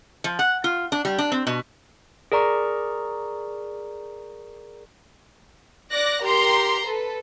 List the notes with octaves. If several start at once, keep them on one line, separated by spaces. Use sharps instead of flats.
F3
F#5
F4
D4
G3
D4
C4
B2
G#4 A#4 D5 A#5 C#6
D5 D6 F#6 A#6
G4 A#4 A#5 C6
A4 B4